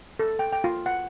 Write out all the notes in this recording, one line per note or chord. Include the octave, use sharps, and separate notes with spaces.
A4
G5
G5
F4
F#5